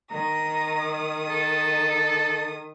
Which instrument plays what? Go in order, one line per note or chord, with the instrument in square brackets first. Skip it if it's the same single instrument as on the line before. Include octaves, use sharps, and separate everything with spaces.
[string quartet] D#3 D#6 [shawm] A#5
[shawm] A4